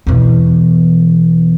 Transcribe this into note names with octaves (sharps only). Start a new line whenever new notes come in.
E2 B2